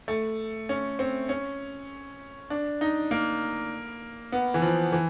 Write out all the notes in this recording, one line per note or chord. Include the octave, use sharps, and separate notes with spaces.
A3
C#4
C4
C#4
D4
D#4
A#3
B3
E3
F3
E3